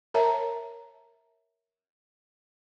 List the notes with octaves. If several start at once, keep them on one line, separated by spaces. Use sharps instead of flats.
A#4 C#5 E5 A5 A#5